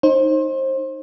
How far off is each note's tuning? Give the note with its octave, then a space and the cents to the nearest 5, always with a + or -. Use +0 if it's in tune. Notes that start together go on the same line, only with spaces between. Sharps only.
D#4 +0 C5 +30